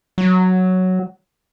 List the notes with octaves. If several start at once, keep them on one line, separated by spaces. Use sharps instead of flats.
F#3